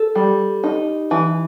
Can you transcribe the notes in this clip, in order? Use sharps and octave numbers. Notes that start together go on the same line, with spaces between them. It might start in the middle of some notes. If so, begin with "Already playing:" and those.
Already playing: A4
G3
D#4
E3